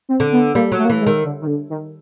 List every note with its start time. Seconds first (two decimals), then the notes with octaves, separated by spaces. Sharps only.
0.09 C4
0.20 D3
0.32 B3
0.55 G3 A#3
0.72 F#3
0.78 A3
0.85 A#3
0.89 E3 A3
1.01 G#3
1.06 D#3
1.24 D3
1.41 D#3
1.47 D3
1.70 D#3